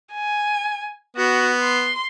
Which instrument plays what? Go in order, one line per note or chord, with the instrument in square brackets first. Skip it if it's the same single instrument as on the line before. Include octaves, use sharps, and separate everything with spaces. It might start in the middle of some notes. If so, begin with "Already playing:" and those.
[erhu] G#5
[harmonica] B3 [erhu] F#4
[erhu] C6